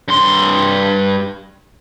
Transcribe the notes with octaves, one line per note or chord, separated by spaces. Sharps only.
G2 C6